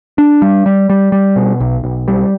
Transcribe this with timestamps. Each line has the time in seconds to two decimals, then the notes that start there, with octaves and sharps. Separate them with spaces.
0.18 D4
0.42 G3
0.66 G3
0.90 G3
1.12 G3
1.36 B2
1.60 B1
1.84 B1
2.08 G3